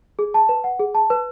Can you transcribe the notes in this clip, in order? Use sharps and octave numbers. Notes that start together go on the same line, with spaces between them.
G#4
A5
B4
F#5
G#4
A5
B4